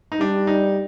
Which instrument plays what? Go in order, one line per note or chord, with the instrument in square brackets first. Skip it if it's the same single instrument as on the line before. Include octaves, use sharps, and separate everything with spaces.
[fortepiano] D#4
[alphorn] G3 [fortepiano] D4
[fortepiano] D#4